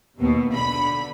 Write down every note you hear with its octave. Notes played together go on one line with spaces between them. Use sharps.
D#2 B2
B1 D3 B5